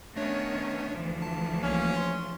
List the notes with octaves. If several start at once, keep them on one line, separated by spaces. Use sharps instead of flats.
D#3 A3 B3 C#4 D4 C#5
D2 E3 F3
A5
C2 A#3 C#4
C6